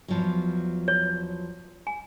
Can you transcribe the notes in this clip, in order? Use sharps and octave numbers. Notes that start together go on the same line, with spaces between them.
E2 F3 F#3
C#5
G#5